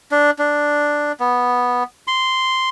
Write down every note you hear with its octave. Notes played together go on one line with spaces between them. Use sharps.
D4
D4
B3
C6